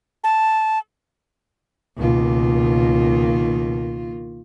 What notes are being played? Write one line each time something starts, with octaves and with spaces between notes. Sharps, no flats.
A5
C#2 B2 D#3 A#3 F4